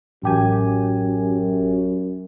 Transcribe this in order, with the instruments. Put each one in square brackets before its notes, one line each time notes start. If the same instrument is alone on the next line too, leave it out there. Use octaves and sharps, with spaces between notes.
[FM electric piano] A1 G4 G#5 [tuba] F#2